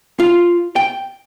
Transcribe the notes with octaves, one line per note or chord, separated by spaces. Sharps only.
F4
G5